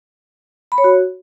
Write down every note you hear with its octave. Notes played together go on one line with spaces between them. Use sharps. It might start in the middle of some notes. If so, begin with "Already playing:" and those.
B5
C#5
F#4